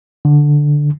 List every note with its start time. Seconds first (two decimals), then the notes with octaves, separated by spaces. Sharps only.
0.25 D3